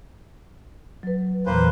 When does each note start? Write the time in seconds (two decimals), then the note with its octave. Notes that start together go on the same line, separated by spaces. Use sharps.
1.03 F#3 B4
1.46 E2 A#2 E3 A#3 B4 C5